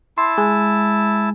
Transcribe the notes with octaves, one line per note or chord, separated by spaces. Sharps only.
E4 A5 C6
G#3